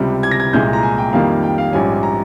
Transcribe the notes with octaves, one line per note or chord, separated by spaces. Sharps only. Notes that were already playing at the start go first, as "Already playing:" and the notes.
Already playing: C#2 C3 G3
G#6
A#6
G#6
C2 A#2 G#3 G6
A#5
G#5
G5
F2 D#3 G3 A#3 D#4 F5
G5
F5
A#1 G#2 G3 C#4 G#5
G#5
A#5